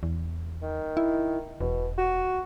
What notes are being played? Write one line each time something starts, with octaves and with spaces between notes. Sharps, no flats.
E2
D#3
E4
E1 B2
F#4